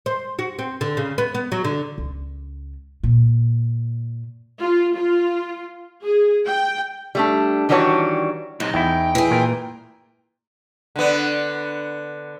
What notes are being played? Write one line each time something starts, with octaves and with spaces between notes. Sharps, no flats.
C5
F#4
C4
D3
C#3
B3
B3
F#3
D3
C#2
A#2
F4
F4
G#4
G5
G3 A3 D4
D#3 E3 G3 D4 F#4 C#5
B1 C3 D#4
E2 E4 G5
E3 G#4
A#2 A#4
D3 B3